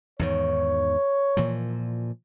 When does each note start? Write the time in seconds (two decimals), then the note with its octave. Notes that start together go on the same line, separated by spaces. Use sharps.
0.19 E2 G#2 D#3 C#5
1.37 A#2 E3 F3